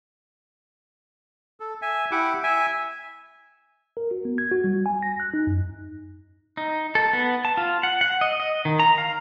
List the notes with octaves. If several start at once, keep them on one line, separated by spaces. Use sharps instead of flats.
A4
E5 G#5
E4 G4 F#5 D6
E5 G#5
A#4
F#4
B3
G#6
F#4
G3
G#5
A#6
F#6
D#4
F#2
D#4
A4
B3
A5
F4
F#5
F#5
D#5
D#5
D#3
A#5
F5